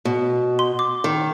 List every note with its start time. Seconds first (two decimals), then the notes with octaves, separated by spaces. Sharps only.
0.05 B2
0.59 C6
0.79 D6
1.04 D#3